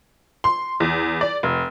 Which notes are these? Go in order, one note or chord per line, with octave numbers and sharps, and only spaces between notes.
C6
E2
D5
F1